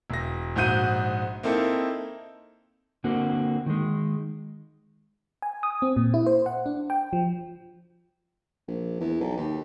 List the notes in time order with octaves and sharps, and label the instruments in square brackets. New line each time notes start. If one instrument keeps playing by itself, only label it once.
[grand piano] E1 A#6
A#1 G#2 F#4 G6 D#7
A#3 C4 D#4 E4 A4
[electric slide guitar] D3 A#3 C4 F#4
D#3 G#3
[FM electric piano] G#5
D#6
C4
A#2
E4
C5
F#5
D4
G5
F3
[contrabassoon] A#1
E2
B1
D#2